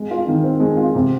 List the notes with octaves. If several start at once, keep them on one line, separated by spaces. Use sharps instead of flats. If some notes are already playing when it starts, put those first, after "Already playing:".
Already playing: G#3
F4
D#3
C4
G#3
F4
C3